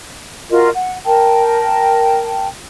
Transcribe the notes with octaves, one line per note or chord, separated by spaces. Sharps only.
F4 F#4 A#4 D#5
F#5
A#4 G5 A5